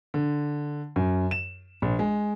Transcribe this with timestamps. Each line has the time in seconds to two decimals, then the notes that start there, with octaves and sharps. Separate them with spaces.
0.14 D3
0.96 F#2
1.31 E7
1.82 A#1
1.99 G#3